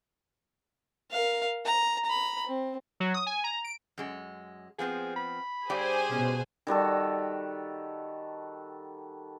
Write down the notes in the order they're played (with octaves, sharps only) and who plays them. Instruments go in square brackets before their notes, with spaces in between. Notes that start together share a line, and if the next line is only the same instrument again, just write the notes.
[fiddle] A#4 F5
A#5
A#5 B5
C4
[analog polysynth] F#3
D#6
G#5
A#5
D7
[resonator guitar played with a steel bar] F#2 G#3
[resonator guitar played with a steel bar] F3 B3 C4 [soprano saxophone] G#4
[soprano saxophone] B5
[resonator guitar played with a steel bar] G2 G4 D5 [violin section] G#4 C5 G#5
[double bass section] B2 [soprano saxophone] C#4
[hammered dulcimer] D#3 G3 F#4 A4